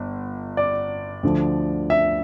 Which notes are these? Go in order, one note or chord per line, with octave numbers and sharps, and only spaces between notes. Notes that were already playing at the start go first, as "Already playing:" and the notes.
Already playing: G1
D5
D2 D3 F3
E5